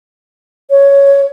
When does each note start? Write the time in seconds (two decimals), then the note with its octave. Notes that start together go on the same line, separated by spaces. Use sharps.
0.70 C#5